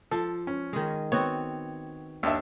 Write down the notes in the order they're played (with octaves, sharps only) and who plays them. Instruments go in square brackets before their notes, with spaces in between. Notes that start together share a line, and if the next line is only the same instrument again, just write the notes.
[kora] F3 [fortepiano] A4
[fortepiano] C#4
[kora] D#3 G#3
[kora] B3 C4 F#4 [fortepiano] C#5
[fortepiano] D#2 D4 E5